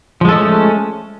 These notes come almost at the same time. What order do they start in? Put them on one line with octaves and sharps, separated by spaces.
F3 G#3 A4 C#4 A3